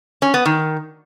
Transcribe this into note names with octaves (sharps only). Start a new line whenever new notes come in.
C#4
B3
D#3